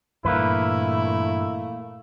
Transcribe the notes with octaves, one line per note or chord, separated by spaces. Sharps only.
G2 A#2 E3 A3 A#3 E4 B4